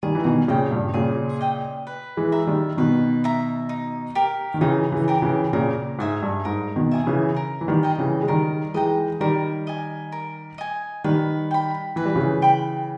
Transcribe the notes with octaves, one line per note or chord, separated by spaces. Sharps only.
D#3 G3 G#4
E3
B2 D#3
A#2 C#3 D#5 G5
G2 A#2
A#2 C#3 G#4
D#5 G5
B4
E3 G#3
E5 A#5
D#3 G3
B2 D#3 B4
E5 A#5
D#4
G4 A#4
D#3
C#3 E3 D#4
C#3 E3
G4 A#4
C#3 E3
A#2 C#3 A#4
G#2 E5 G#5 D#6
G2
G#2 A#4
B2 D#3
E5 G#5 D#6
C#3 E3
A#4
E3
D#3 G3
D#5 G5 A#5
C#3 E3
G#3
D#3 G3 A#4
E3 G#3 D#5 G5 A#5
D#3 G3 A#4
D#5 G#5
A#4
D#5 G#5
D#3 G3 B4
G5 B5
E3 B4
G3
C#3 E3
G5 B5